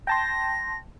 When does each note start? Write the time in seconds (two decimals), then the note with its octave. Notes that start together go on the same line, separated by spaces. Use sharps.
0.07 G5 A5 C6 A#6